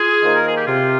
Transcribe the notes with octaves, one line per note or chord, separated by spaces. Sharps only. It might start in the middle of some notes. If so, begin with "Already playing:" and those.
Already playing: F4 G#4
D#3 A#3 D#4 C5
A#4
G#4
G4
C3 F4